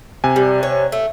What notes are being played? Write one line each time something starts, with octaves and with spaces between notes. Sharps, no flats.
C3 G#5
G3
C#5
A3